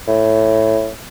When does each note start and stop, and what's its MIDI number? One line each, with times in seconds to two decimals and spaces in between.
0.07 0.90 45